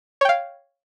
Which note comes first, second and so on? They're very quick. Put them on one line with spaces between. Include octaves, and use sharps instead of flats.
C#5 G5 F5